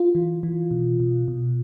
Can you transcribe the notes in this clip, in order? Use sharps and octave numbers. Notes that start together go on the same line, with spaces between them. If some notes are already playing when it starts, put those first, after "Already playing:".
Already playing: F4
E3
E3
B2
B2
B2